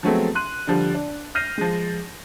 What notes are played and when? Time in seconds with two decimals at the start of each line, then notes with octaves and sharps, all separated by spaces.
0.03 F3 F#3 G#3 A3 B3 C4
0.35 C6 F#6 D#7
0.67 D3 F3 G3
0.95 D4
1.35 F6 G6 A#6 C7 D#7
1.58 F3 G#3